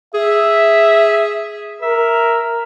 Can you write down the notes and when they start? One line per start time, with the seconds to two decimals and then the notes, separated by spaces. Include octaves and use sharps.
0.14 G#4 E5
1.82 A#4 E5